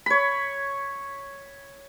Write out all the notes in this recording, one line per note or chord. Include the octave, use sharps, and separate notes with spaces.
C#5 B5